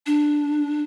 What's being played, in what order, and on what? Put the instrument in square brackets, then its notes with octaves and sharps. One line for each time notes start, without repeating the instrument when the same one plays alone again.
[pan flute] D4